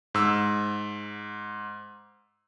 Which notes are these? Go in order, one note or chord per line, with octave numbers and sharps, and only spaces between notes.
G#2 E6